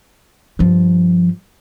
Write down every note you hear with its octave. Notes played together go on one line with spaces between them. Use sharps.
G2 F3